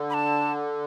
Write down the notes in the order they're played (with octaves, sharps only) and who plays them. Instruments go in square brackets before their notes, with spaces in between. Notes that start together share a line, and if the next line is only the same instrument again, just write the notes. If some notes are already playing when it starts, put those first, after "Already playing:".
Already playing: [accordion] D3
[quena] B5
A5